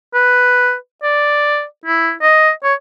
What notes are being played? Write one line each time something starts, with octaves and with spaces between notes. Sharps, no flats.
B4
D5
E4
D#5
C#5